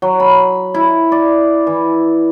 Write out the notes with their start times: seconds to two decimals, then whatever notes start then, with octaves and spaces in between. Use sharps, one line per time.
0.02 F#3
0.20 B5
0.74 E4
1.12 D5
1.67 E3